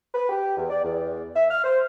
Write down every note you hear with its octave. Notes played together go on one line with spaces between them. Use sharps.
B4
G4
E2
D5
E2
E5
F6
C5